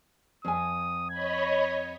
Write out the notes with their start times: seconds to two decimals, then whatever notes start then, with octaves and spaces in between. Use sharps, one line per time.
0.45 F2 G#5 D#6
1.10 C#5 D#5 B5 G#6